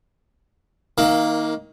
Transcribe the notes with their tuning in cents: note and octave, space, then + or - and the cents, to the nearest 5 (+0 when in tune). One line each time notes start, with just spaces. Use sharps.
D#3 +20 A#3 +0